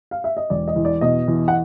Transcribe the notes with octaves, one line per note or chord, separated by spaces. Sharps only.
F5
E5
D#5
E1 D5
D#5
E2
D5
B2 D#5
E2
F#5